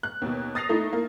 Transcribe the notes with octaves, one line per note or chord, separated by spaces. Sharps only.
F#6
D#2 B2
D#6 A6 A#6 C7 F7
A3 D#4 E4
A#3